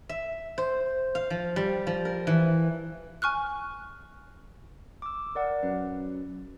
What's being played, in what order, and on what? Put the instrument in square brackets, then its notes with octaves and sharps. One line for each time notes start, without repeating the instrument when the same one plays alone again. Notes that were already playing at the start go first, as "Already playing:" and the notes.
[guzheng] E5
C5
F5
F3
G3
F3
A#4
E3
[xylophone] G#5 C#6 F6 F#6
[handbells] D6 E6
A#4 D5 F#5
[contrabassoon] F#2 [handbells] B4